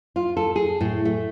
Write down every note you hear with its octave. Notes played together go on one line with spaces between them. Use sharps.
F4
A4
G#4
A2
A3